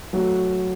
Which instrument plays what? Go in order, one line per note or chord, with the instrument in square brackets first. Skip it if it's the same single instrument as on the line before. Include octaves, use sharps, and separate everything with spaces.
[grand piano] F#3 A3